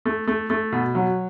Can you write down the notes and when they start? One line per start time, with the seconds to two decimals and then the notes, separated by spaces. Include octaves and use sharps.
0.05 A3
0.27 A3
0.50 A3
0.72 B2
0.95 F#3